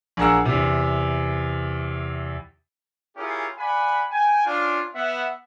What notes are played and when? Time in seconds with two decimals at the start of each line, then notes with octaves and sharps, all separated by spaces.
0.17 A#1 G#4 A#4 F#5 E6
0.45 E2 C3
3.17 C#4 E4 F4 G4 G#4 A#4
3.57 D5 F5 F#5 G#5 B5
4.11 G5 G#5
4.46 C#4 D4 F4
4.94 B3 E5 F#5